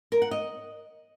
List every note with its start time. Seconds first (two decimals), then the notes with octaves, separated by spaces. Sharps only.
0.12 A#4
0.22 F#5
0.31 D#5